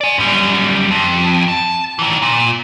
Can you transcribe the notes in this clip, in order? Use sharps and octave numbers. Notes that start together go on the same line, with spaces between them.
D5 G#5
F#2 G3
F2
A5
D#3 E3
A#2